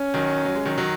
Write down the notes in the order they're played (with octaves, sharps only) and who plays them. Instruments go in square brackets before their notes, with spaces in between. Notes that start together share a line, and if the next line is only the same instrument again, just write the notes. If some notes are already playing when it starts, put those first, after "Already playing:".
Already playing: [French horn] C#4
[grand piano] D#3 F#3
F#3
G#3
D#3 F#3
D#3 F#3